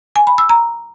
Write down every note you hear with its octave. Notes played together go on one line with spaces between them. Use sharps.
G#5
B5
E6
A#5